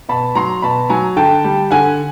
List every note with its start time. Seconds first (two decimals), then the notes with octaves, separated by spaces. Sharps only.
0.09 B2 A5 B5
0.35 F#3 A#5 C6
0.62 B2 A5 B5
0.89 F#3 G#5 A#5
1.16 D3 G5 A5
1.44 G3
1.71 D3 F#5 G#5